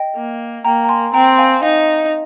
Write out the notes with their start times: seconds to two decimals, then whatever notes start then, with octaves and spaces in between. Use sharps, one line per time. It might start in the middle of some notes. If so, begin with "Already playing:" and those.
Already playing: D#5 G5
0.16 A#3
0.65 A#3 G5 A#5
0.84 A#5
0.89 G#5 C6
1.13 C4 G5 A#5
1.38 F5 G#5
1.63 D#4 F5